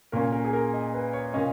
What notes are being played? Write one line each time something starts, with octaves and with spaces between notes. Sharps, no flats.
A#2 A#3 C#4 A#4
A#4
G#4
A#4
D#5
B4
C#5
A#2 A#3 C#4 D#5